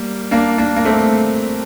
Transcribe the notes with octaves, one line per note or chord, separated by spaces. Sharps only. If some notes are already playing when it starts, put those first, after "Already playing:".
Already playing: G3 A#3
A#3 D4
A#3 D4
A#3
A3 C4